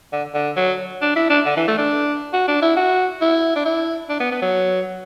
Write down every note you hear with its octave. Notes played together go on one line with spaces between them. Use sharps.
D3
D3
F#3
D4
E4
D4
D3
E3
A3
D4
F#4
D4
E4
F#4
E4
D4
E4
D4
B3
B3
F#3